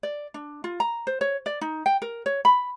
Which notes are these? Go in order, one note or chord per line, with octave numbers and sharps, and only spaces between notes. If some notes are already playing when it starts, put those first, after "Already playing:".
D5
D4
F4
A#5
C5
C#5
D5
D#4
G5
A#4
C#5
B5